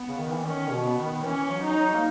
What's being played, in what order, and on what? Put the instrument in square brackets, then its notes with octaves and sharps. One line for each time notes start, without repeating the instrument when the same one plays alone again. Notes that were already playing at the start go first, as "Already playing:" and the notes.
Already playing: [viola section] B3
[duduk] C#3
D#3
E3
[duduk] D#3 [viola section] C#4
[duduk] B2
[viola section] B3
[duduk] D#3
[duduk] E3 [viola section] C#4
[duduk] F#3
[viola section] D#4
[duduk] F#3
A#3